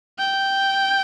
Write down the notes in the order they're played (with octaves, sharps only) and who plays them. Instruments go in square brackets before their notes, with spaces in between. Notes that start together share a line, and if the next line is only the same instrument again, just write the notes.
[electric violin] G5